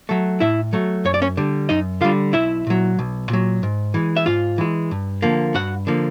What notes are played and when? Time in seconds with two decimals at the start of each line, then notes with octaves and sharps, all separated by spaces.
0.09 F#3 A3
0.40 A2 E4 E5
0.73 F#3 A3
1.05 F#2 C#5
1.14 D5
1.22 C#4 C#5
1.37 D3 G3
1.69 F#2 D#4 D#5
2.01 D3 G3 F4 F5
2.33 B1 E4 E5
2.67 A#2 F#3
2.99 B1
3.30 A#2 F#3
3.63 G#2
3.94 E3 G#3
4.16 E5
4.26 G#2 F4 F5
4.58 E3 G#3
4.91 G2
5.22 D3 F3 A#3
5.54 G2 F#4 F#5
5.87 D3 F3 A#3